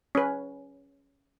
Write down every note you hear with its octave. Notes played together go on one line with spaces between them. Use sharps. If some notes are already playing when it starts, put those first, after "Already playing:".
C#4 B4